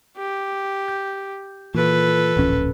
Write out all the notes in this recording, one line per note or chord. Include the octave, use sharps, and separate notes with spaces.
G4
G6
A#2 E3 F4 A4 B4
D1 A#1 C#4